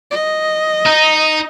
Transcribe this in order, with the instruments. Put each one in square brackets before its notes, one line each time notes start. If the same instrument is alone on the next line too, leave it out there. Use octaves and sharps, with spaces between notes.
[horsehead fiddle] D#5
[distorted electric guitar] D#4